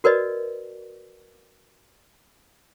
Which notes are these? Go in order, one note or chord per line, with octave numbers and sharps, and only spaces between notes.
F#4 A#4 B4 D5 D#5